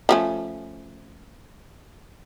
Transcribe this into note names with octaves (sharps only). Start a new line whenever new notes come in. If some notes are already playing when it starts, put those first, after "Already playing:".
F3 A3 C#4